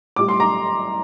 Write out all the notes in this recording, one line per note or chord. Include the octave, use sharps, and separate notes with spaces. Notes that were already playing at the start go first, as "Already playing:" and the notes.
A2 G3 D6
C6
A#5 D6